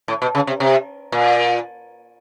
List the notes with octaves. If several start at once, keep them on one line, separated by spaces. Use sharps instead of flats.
A2
B2
C#3
C3
C3
A#2